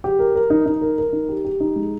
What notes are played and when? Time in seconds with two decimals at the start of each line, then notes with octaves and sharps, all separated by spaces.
0.04 G4
0.19 A#4
0.35 A#4
0.50 D#4
0.66 D#4
0.81 A#4
0.98 A#4
1.13 D#4
1.29 G4
1.45 G4
1.60 D#4
1.76 G#3